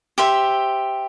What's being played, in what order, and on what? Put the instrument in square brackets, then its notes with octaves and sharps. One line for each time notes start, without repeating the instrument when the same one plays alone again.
[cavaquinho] G4 C5 E5